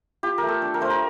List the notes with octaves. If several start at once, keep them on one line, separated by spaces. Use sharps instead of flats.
F4 G4
A#4
A3
A4
D4
A#4
A3 C5
A#4